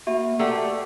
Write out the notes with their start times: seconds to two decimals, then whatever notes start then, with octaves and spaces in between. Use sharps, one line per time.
0.07 A#3 F#4 E5 B5
0.39 A3 G4 B4 D5 F#5 A#5